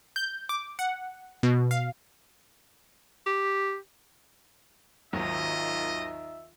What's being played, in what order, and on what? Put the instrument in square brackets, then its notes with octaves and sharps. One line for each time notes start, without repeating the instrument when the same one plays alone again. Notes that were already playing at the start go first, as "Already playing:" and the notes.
[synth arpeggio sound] G6
D6
F#5
B2
F5
[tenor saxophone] G4
[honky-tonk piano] G#1 D#2 F#3 [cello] D#3 F4 [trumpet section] D#4 E5 [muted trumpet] D#5